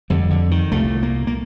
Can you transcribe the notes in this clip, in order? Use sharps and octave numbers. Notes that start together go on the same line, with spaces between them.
F2 D3 G3
D3
D#3
C2 A#2 A3
A#3
A#3